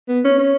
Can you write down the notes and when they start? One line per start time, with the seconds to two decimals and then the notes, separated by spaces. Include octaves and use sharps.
0.09 B3
0.25 C#4
0.39 C#4